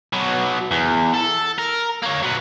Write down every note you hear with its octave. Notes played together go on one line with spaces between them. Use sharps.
B2 F#3
E2
A4
A#4
A#3 C#5
F#3 B4